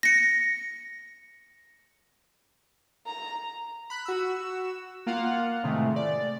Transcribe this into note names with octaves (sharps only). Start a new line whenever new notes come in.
A#6 C#7
A#5
B5 F#6
F#4 E6
A#3 F4 F5 F#5
A2 C3 D#3 G#3 A3
D5